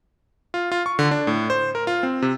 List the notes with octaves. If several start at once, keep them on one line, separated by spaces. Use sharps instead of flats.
F4
F4
C#6
D3
D4
A2
C5
A#4
F4
C4
C3